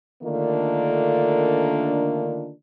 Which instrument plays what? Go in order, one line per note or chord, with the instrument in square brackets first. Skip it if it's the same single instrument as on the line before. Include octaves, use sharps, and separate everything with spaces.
[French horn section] D3 D#3 A3 A#3 D4 F4